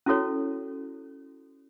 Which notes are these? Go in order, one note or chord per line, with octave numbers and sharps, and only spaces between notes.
C#4 E4 F#4 A4 C#5